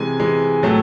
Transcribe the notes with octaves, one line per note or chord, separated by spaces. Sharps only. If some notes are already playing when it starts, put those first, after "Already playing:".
Already playing: C3 E3 G#3 G#5
C3 E3 G#3
A2 F#3 A3